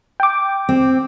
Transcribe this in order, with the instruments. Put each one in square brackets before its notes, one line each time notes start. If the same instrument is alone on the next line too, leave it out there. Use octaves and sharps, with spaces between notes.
[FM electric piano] G5 D6
[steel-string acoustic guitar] C4